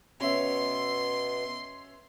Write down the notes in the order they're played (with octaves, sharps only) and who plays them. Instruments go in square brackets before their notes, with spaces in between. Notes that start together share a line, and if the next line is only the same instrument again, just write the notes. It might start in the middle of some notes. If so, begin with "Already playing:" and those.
[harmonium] B2 B3 [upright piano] C#4 E5 [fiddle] C6